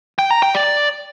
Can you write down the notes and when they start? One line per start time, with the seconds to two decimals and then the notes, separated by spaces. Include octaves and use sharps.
0.19 G5
0.31 A#5
0.43 G5
0.55 D5